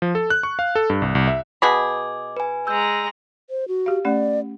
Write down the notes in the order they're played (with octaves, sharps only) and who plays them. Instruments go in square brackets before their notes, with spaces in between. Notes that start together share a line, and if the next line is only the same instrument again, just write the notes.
[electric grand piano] F3
A4
F#6
C#6
F5
A4
G2
C2
C2
E5
[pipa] B2 G#4 B5 [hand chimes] D#5 D6
[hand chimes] B4 G#5
[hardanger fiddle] G#3 A#5 [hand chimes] E6 G6
[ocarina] C5
F#4
[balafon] G4 F5
[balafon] A3 C#4 F#5 [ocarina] D5